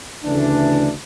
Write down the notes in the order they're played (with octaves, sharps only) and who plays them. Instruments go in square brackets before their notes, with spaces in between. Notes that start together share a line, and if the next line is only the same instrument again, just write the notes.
[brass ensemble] D2 C#3 E3 A3 D4